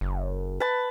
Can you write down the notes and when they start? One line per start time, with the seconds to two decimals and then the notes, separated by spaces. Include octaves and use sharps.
0.01 F#1
0.60 B4 A5